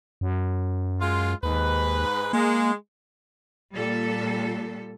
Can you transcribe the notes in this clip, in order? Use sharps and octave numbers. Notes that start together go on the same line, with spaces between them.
F#2
G#3 F4
D#2 G#2 B4
G#3 A#3
A#2 G3 A4